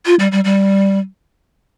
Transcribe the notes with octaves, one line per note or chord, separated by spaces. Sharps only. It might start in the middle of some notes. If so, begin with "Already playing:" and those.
F4
G3
G3
G3